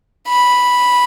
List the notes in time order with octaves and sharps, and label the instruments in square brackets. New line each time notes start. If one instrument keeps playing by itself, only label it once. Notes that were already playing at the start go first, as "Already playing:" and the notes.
[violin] B5